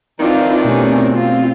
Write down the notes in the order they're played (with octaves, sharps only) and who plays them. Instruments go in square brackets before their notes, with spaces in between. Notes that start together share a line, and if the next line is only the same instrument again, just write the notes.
[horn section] D#3 E3 D4 [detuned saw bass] C4 [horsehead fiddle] D#4 F4
[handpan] B2 A3 G4 [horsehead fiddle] C#4
[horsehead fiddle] F4